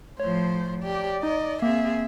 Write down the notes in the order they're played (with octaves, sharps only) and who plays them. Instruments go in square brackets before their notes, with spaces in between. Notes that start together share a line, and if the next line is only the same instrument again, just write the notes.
[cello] A2 F3 [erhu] C5 [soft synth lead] C#5
[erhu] G4 [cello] D5
[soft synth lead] D#4 [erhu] D#5
[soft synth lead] A#3 [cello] C4 G#4 [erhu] E5